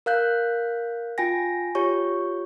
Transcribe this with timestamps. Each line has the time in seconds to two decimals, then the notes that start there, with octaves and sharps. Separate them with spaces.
0.06 A#4 F5 F#6 G6
1.18 F4 G5 G#5 A#6
1.75 F4 G4 C#5 C#6